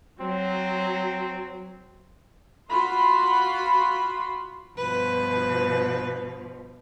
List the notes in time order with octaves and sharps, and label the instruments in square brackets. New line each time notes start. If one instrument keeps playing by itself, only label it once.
[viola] F#3 [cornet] C4
[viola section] F4 F#4 B5 C6
[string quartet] G2 B2 F3 [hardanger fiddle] B4